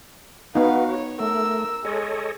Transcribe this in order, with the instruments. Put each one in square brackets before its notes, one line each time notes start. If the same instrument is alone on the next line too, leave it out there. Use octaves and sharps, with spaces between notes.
[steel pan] B3 D#4 [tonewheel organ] F#4 [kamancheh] B4 F5
[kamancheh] C#5
[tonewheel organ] A3 [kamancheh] A#4 E6
[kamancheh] G#3 [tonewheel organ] A4 C#5 D#5